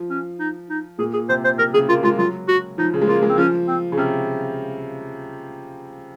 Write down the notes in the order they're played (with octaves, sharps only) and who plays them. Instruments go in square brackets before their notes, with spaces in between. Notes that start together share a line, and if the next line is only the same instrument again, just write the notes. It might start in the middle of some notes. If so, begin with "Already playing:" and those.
Already playing: [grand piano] F3
[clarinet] C#4
D#4
D#4
[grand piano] A#2 [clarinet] G#4
[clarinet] G#4
[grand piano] C3 [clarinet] C5
[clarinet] C5
[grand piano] C3 [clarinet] A#4
[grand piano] C#3 [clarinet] G#4
[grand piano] A#3 [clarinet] F4
[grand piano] G#3 [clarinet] F4
[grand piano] F#3 [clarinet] F4
[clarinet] F#4
[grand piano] F3 [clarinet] D#4
[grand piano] C#3
G#3
[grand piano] A#3 [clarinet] F4
[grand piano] G#3
[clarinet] C4
[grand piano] F3 [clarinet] C#4
[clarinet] C4
[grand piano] C#3
[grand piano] C3 [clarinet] C#4